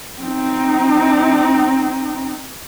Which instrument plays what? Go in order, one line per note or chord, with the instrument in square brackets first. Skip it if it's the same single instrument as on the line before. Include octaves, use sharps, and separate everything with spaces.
[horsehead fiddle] C4 D#4